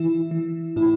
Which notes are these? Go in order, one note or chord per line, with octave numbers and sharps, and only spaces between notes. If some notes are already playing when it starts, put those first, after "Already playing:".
Already playing: E3 E4
E3
A2 E4